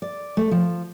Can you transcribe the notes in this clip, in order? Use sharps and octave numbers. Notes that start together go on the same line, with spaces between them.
D5
A3
F3